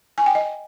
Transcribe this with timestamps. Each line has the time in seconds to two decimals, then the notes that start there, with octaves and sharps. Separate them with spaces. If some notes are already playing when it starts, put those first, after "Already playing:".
0.18 G#5
0.26 G5
0.35 D#5